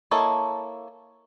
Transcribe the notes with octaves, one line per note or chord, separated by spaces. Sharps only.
A#3 E4 A4 C#5 D#5